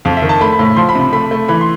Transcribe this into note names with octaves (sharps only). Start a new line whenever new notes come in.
F2 F5
E5
D#3
A5
A3 B5
B5
A2
B5
F3 C6
B5
C3
B5
A3 B5
A3
E3 B5
C6